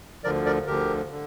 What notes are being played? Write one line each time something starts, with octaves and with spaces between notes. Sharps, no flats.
D2 D3 F3 A#4 D5
A#4 D5
D2 D3 F3 G4 A#4
D3